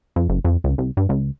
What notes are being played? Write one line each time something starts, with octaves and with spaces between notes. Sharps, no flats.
F2
F#1
F2
C#2
C2
G2
C#2